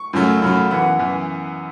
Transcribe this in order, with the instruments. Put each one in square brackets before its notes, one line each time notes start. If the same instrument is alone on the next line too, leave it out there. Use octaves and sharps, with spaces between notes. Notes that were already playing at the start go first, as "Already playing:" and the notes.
Already playing: [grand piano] C#6
F#2 C#3 F#3 A3
F#2 C#3 F#3 A3 B5
F#2 E3 B3 F#5
F#2 E3 B3